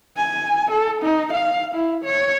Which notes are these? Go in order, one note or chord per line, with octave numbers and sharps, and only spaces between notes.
G#5
A4
D#4
F5
E4
C#5